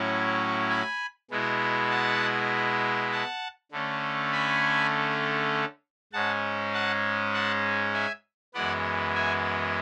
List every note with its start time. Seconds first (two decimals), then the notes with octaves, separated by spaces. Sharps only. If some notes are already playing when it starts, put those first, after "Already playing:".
Already playing: A2 F#3 C#4 E4
0.70 G#5 B5
1.31 B2 G#3 B3 E4
1.90 F#5 A5
3.12 F#5 A5
3.72 D3 A3 C#4
4.32 G#5 B5
6.13 G#2 G#3 C#4 F#5 A5
6.74 F#5 A5
7.34 F#5 A5
7.94 E5 G#5
8.54 F#2 E3 G#3 B3 D5 F#5
9.15 E5 G#5